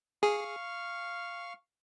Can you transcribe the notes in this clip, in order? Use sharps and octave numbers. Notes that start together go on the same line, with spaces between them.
G#4 F5 C#6 F6